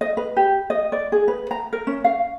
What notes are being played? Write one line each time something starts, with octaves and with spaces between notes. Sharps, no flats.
D#5
B4
G4
D#5
D5
G#4
B4
A#5
A#4
C#4
F5